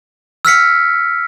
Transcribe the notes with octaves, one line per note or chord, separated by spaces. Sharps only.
E6 F6 B6 C#7